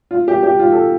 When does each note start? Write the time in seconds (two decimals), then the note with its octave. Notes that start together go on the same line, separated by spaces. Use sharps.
0.11 F4
0.28 G4
0.43 G4
0.59 F4
0.72 A4